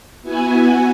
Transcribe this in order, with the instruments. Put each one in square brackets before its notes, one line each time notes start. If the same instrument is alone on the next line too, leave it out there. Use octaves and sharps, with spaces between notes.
[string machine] B3 E4 F#4 G#5